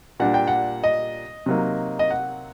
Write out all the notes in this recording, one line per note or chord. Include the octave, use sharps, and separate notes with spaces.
A#2 G3 D4 F#5
G5
F#5
D#5
C3 F#3 A#3 D#4
D#5
F#5